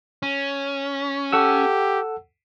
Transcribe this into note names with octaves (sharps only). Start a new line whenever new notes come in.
C#4
G4 A4 F#5 E6